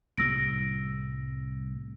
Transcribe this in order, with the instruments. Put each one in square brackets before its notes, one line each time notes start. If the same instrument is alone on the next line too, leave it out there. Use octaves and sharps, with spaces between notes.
[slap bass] C2 A2 G3 [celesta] E6 A#6 D7